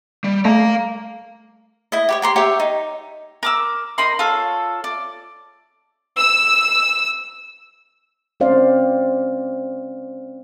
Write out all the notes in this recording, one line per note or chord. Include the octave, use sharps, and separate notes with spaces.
G3
A3 F5 A#5
E4 D#5
G4 B4 C#5
G4 A#5 C6
G4 C#5 E5 G5
D#4
A#4 D6 E6
D#4 A#4 B5 C6
F4 A4 C#5
D5
E6
G#3 C4 C#4 C5 D5 F5